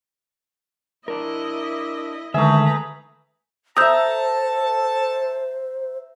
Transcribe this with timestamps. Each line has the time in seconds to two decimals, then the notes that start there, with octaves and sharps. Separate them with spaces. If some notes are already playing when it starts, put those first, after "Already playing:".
1.08 D4 E4 A#4 D#5
2.34 D3 D#3 G#3 A3 G#4 B4 E5 A#5
3.77 A4 C5 E5 A5 A#5 D#6 E6 G6